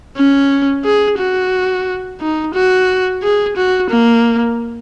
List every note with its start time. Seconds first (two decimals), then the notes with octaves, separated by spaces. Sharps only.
0.17 C#4
0.85 G#4
1.19 F#4
2.20 D#4
2.54 F#4
3.23 G#4
3.57 F#4
3.90 A#3